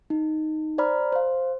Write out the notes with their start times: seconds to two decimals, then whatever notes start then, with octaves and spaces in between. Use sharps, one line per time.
0.10 D#4
0.78 C5 D5 A#5 B5 F6
1.12 C5 F5